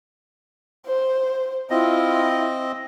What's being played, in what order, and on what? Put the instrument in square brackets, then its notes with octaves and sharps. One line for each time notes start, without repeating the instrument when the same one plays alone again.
[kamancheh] C5
[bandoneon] C4 D#5 [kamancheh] E4 F4